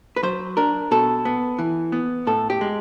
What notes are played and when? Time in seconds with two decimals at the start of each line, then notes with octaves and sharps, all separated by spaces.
0.16 B4
0.23 F#3 C5
0.57 D4 A#4
0.91 B2 A4
1.25 B3
1.58 E3
1.92 B3
2.27 A2 A4
2.50 G4
2.61 G#3